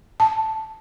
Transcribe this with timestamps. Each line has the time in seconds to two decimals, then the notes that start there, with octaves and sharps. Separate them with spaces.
0.20 A5